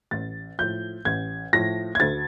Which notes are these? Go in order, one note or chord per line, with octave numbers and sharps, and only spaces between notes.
A1 A6
A2 F3 G6
A1 G#6
A2 F3 A#6
G#6
D2 A6